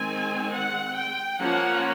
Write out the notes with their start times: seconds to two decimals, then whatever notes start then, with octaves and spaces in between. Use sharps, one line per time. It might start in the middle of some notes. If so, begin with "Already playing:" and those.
Already playing: D#3 G#3 C4 G#5
0.53 F#5
0.97 G5
1.40 F3 A#3 C#4 F#5